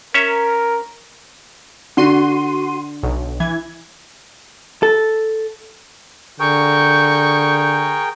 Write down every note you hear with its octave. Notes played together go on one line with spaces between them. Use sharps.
C#4 A#4 C#5 E5
D3 F#4 C6 D#7
B1
E3 G#6
A4
D3 G#4 A#4 G5 C#6 G6